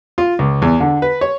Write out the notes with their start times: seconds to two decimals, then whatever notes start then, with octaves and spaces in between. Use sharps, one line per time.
0.18 F4
0.39 C#2
0.62 E2
0.80 D3
1.02 B4
1.21 C#5